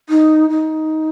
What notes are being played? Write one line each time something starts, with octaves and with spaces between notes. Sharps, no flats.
D#4
D#4